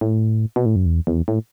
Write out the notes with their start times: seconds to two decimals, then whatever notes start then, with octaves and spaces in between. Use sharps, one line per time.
0.01 A2
0.56 B2
0.66 A2
0.76 F#2
0.86 E2
1.07 E2
1.28 A2